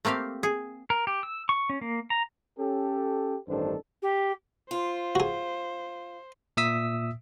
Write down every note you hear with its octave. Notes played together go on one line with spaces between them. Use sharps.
A3 A#3 C4 G4 F5
G#4
A#4
G4
E6
C#6
C#4
A#3
A#5
C#4 G4 A4
A1 G2 D#3 D4 A4 C5
G4
F4 C5
F#4 G#4
A#2 E5 D#6 E6 B6